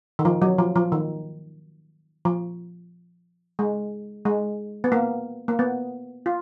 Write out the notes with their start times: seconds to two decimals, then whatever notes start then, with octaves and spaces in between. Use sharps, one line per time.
0.19 D#3
0.25 F3
0.42 F#3
0.58 F3
0.76 F3
0.92 D#3
2.25 F3
3.59 G#3
4.25 G#3
4.84 B3
4.92 A#3
5.48 A#3
5.59 B3
6.26 F4